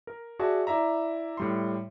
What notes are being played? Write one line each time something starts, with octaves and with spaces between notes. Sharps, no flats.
A#4
F#4 G#4 D5 E5 A5
E4 D5 E5 A#5
A2 G3 C6